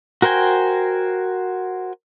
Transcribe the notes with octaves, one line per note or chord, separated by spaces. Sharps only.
F#4 A#4 C5 G5 G#5